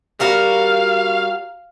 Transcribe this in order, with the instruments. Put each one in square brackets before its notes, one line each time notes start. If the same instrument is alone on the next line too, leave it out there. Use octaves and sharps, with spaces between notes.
[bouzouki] G3 F#4 A#4 [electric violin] F5